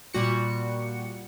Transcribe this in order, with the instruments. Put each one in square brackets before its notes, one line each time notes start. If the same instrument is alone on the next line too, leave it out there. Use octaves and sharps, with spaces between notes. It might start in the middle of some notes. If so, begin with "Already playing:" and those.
[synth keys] A#2 G3 F#4 C#7